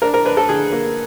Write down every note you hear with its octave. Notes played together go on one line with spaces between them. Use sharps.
D4 A#4
A#4
D4 B4
A4
D3 G#4
A#3